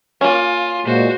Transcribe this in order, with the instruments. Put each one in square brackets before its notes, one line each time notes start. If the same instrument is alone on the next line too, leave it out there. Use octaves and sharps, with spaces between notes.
[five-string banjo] A#3 C#4 [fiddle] F4
[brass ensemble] A#2 G#3 [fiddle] F#4 C5